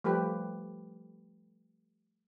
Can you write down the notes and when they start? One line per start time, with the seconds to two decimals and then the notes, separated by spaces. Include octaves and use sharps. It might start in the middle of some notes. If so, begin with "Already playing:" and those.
0.04 F3 G3 A3 G4 B4